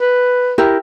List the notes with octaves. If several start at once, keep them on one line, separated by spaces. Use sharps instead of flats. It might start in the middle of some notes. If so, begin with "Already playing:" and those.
B4
E4 G4 A#4